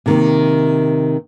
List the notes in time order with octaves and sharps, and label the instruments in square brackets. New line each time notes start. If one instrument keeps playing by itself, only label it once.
[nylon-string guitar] C3 D#3 A#3